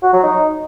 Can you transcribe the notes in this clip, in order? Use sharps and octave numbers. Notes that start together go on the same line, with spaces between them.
F#4
F#3
D#4